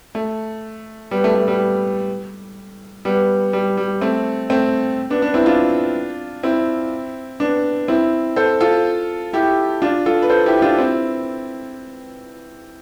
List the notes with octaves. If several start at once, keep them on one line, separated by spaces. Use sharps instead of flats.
A3
G3 B3
A3
A3
G3 B3
G3 B3
G3
G3
A3 C4
A3 C4
B3 D4
B3 D4
C4 E4
D4 F4
C4 E4
B3 D4
C4 E4
A4 C5
F4 A4
E4 G4
D4 F4
F4 A4
B4
A4 C5
E4 G4
D4 F4
C4 E4